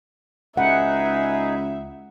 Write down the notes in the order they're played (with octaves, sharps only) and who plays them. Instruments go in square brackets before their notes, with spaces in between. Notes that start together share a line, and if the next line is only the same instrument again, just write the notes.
[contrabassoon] C#2 [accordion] D#4 G#4 B4 [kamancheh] E5 [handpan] F#5